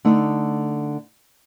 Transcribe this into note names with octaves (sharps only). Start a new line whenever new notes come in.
D3 A3 D#4